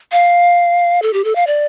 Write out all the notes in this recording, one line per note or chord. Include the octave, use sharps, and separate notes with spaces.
F5
A4
G4
A4
F5
D5